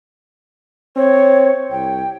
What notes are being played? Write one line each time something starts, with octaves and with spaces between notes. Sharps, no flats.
C4 C#5
C2 G5